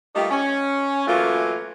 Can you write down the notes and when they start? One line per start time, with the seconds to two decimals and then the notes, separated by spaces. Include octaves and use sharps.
0.15 G3 A3 A#3 D#4 F4 G4
0.31 C#4
1.08 E3 F#3 A3 A#3 F4